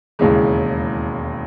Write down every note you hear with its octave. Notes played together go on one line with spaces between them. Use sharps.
E1 D#2 C#3 E3 G#3